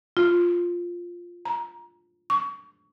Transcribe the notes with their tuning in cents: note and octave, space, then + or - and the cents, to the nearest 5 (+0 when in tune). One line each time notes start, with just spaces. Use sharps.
F4 +5
A#5 +20
C#6 +30